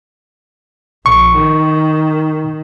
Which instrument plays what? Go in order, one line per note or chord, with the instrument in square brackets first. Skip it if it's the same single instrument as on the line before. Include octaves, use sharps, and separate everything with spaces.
[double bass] A#1 [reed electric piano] C#6
[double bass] D#3